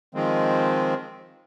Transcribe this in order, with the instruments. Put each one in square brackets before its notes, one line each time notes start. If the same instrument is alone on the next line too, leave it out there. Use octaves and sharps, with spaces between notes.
[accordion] D#3 F3 G#3 C4